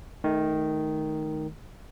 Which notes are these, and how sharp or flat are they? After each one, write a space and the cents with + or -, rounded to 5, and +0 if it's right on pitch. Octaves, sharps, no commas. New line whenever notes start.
D#3 +0 A3 -25